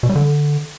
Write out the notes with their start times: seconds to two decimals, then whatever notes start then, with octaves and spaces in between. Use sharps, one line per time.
0.03 B2
0.09 G3
0.16 D3